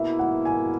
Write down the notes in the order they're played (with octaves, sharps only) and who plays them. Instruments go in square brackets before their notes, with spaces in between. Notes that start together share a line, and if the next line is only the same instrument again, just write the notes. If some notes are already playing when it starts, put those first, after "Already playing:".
Already playing: [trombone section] B2 A#3 E4 [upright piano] E5
[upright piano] F#5
G#5